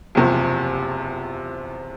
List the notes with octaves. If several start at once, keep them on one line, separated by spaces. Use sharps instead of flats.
F#1 E2 C3 F3